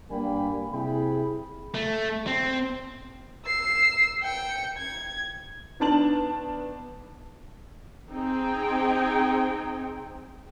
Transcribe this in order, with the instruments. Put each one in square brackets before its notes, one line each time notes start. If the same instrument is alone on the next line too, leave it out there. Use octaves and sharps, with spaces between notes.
[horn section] G2 G3 A#3 G5 G#5 B5
C3 E4 G#4 G5 B5
[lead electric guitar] A3
C4
[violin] E6 C7
G5 C#7
G#6
[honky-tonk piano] D#3 B3 D4 A5 F#7
[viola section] C4 D#4 G#4 G5